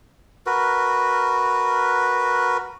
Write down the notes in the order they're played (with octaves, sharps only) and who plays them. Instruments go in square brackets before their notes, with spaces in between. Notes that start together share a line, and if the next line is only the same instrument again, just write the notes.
[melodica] F#4 A#4 B4